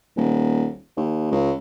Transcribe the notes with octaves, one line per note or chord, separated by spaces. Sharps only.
D#1
D#2
C#2